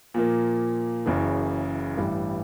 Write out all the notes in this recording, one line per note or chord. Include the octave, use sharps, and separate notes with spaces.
A#2 F3 A#3
F#1 F#2 C#3 E3
A1 G2 E3 G3